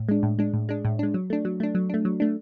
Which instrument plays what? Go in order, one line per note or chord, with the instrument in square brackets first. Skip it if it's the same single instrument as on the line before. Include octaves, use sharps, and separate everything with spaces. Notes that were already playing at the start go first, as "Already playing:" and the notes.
Already playing: [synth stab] A2
G#3 D4
A2
G#3 D4
A2
G#3 D4
A2
G#3 D4
F#3
A3 D4
F#3
A3 D4
F#3
A3 D4
F#3
A3 D4